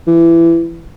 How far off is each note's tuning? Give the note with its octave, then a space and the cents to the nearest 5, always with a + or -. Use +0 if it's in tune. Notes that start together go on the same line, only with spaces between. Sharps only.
E3 +20